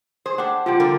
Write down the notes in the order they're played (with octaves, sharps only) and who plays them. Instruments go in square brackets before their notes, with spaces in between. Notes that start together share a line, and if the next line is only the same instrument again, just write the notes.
[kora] G#4 [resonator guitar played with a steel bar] C5
[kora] D4 G4 [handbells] F#5
[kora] C3 F3 G3 [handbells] F4 G5
[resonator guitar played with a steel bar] D3 [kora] A#4